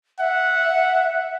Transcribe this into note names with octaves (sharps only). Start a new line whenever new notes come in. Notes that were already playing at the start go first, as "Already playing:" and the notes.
E5 F#5